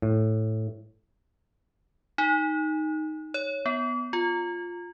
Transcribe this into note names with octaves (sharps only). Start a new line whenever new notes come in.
A2
D#4
C#5
B3
F4